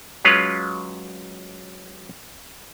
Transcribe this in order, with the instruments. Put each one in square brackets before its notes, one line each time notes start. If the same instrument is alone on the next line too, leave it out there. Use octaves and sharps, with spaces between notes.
[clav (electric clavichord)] F#3 G#3 C#4 F4 B4 F5